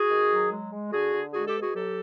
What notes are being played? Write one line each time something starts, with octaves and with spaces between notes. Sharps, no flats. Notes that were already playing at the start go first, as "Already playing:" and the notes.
Already playing: F#4 G#4
D#3
F#3
G#3
G#3
D3 F#4 G#4
D3
G#3 F#4 G#4
G4 A4
B2
F#4 G#4
F#3 G4 A4